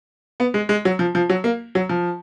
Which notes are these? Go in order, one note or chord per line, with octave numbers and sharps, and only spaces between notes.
B3
G#3
G#3
F#3
F3
F3
F#3
A#3
F#3
F3